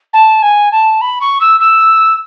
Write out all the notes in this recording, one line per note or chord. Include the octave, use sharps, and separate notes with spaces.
A5
G#5
A5
B5
C#6
E6
E6